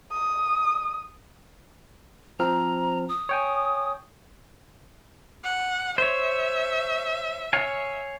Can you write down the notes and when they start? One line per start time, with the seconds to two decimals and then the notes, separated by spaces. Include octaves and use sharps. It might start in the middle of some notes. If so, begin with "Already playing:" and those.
0.11 D#6
2.39 F3 C4 A#5 F6
3.09 D#6
3.29 C#5 G5 G#5
5.44 F#5
5.98 C5 C#5 E5
7.53 C#5 F5 G#5